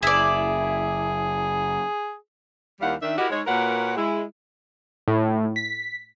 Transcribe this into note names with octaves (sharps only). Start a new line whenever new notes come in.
F#1 E4 G#4 D5
D#2 D#3 G3 E4 F5 F#5
D#3 D4 E5
E4 F#4 G4 A#4 D#5 F#5
G#2 G#3 C#5
A#2 F#4 A#4 B4 C#5 F#5
G#3 E4
A2
B6